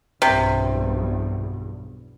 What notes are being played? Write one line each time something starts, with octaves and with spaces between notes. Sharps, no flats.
B1 E2 G2 C3